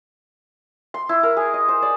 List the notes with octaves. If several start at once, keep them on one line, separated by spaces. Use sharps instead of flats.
C6
E4
A#4
G#4
D#5
C5
D5